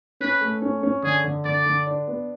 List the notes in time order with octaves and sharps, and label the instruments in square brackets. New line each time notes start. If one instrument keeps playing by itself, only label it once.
[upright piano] C#4 [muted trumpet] B4
[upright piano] A3
C#4
C#4
[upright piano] D3 [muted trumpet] G#4
[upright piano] D3
[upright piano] D3 [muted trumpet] D5
[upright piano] D3
D4
B3